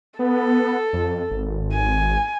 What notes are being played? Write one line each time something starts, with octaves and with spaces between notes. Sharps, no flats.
B3 A4
F2
G#1
G#5